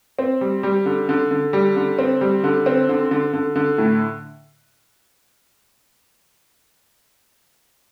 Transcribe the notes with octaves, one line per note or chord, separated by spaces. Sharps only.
C4
G3
G3
D3
D3
D3
G3
D3
C4
G3
D3
C4
D3
D3
D3
D3
A2